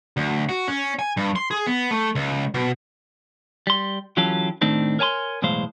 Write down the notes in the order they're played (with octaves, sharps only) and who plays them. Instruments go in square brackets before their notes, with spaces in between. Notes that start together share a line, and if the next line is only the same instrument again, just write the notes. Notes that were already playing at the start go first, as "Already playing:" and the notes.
[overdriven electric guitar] D2
F#4
C#4
G#5
G2
C6
G#4
B3
A3
C#2
B2
[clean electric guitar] G3 C6
E3 F#3 C#4 F4 G4 A4
A2 D#3 A3 C4 D4 D#4
A#4 C#5 G#5 A5 C6
B1 E2 A2 G#3 C5 F5